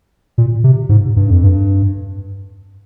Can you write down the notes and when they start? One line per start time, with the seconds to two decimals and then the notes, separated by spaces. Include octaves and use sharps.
0.38 A#2
0.64 C3
0.89 G#2
1.16 G2
1.30 F2
1.43 G2